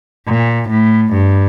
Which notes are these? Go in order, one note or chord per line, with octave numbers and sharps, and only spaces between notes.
A#2
A2
G2